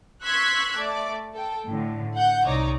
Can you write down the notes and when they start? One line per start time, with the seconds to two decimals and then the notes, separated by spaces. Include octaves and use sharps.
0.24 C6 C#6 E6 F#6 G#6 B6
0.75 A3 D5
1.34 A4 G5
1.67 A2 D3
2.16 F#5 G6
2.46 C2 C3 D#4 C#5 D5 A#5